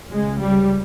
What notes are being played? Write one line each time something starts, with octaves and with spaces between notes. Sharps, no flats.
C#2 C#3 G#3
G3